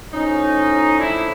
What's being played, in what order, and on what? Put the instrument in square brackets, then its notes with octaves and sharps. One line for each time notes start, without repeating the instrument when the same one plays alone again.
[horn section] A2 F3 C#4 D#4
D4 E4